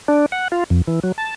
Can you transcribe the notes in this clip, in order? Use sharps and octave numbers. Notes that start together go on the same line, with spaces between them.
D4
F#5
F4
F2
E3
F#3
A5